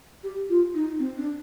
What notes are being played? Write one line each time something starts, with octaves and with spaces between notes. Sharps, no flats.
G4
F4
D#4
C4
D4